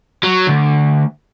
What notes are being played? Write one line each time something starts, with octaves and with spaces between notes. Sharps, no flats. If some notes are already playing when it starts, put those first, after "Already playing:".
F#3
D2